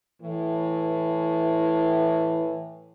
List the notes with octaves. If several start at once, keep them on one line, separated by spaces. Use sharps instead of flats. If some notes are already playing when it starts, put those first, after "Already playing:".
A2 E3